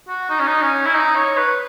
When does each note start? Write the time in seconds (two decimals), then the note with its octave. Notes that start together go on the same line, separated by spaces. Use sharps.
0.08 F#4
0.30 D#4
0.39 C#4
0.47 D#4
0.62 C#4
0.86 E4
0.95 D#4
1.16 C#5
1.37 B4